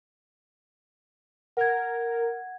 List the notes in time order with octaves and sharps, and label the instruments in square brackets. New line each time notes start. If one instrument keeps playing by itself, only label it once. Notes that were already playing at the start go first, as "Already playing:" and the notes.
[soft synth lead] A#4 [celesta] F#5 G#6